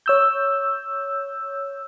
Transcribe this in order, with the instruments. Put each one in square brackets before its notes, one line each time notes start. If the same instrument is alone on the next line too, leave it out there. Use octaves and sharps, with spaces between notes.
[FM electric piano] C#5 E6 G6